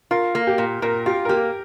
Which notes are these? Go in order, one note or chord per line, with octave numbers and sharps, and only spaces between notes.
F4 A#4
A#3
G4
A#2
A#2 A#4
F4 G4
A#4
A#3 G4